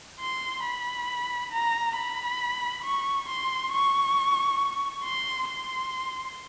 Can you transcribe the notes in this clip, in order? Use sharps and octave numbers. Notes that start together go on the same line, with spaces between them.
C6
B5
A#5
B5
C#6
C6
C#6
C6
C6